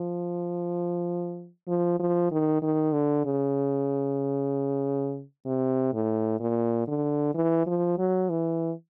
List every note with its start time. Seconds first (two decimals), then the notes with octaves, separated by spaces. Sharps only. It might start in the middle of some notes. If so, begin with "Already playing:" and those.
Already playing: F3
1.68 F3
1.99 F3
2.31 D#3
2.62 D#3
2.93 D3
3.25 C#3
5.46 C3
5.93 A2
6.40 A#2
6.88 D3
7.35 E3
7.67 F3
7.98 F#3
8.30 E3